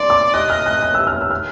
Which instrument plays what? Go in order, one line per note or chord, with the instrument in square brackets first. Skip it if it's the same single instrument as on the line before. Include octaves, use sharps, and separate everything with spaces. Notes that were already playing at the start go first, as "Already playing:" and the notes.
Already playing: [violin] D5 [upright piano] C6
[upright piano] D6
[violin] D#5 [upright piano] F#6
[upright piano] F6
F#6
F#6
E6
F6
E6
F6